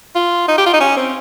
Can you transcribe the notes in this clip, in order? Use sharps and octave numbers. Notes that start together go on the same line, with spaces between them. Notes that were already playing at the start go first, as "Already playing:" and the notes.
F4
D#4
G4
F4
D#4
C#4
C4